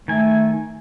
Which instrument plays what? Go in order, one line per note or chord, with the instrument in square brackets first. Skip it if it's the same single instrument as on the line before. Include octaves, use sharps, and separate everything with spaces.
[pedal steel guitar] D#3 G#5 [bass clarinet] A3